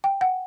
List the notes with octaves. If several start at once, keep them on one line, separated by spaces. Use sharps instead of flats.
G5
F#5